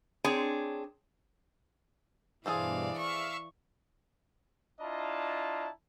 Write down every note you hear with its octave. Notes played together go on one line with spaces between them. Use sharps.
C4 D4 G#4 C#5
G2 B2 E3 G#4 A4 C5 D5 F5
E5 F5 C#6
D4 E4 F4 D#5 A5 A#5